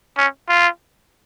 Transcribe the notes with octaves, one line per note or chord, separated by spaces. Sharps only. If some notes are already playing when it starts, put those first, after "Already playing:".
C#4
F4